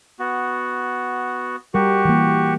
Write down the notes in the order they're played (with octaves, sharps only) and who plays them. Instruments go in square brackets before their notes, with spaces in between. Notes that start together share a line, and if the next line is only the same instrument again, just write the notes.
[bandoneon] B3 F#4
[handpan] G3 A#4 [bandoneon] F#4 G4 C#6
[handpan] E3 A#3